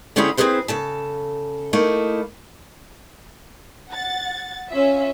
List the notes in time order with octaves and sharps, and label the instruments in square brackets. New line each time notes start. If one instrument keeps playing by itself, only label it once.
[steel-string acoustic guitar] D3 A3 C4 C#4 E4 G#4
C4 D4 E4 G#4 B4 C5
C#3 A4 A5
A3 A#3 D#4 E4
[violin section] F#5 A6
C#4 F4 E5